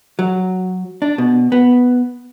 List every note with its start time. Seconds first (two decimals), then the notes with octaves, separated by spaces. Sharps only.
0.19 F#3
1.02 D4
1.18 B2
1.52 B3